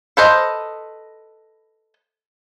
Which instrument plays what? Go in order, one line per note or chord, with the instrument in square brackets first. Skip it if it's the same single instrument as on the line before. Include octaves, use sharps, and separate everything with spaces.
[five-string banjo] A4 B4 C5 D#5